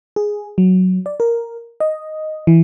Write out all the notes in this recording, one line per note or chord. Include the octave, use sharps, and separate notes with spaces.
G#4
F#3
D5
A#4
D#5
E3